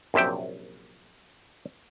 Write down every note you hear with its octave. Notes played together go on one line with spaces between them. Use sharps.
A#1 F#2 C3 E5 G5